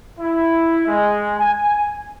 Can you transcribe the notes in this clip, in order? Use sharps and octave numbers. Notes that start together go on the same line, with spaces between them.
E4
G#3
G#5